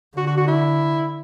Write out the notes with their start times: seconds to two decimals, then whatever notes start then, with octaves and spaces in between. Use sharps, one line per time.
0.17 D3 F#4
0.27 F#4
0.38 F#4
0.48 E4